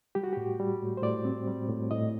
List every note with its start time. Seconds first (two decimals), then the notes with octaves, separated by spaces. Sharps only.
0.15 G3 G4
0.24 F#4
0.33 A2 G4
0.60 G3
0.82 A2
0.97 C5
1.03 A2 D5
1.25 C4
1.47 G3
1.69 A2
1.91 A2 D#5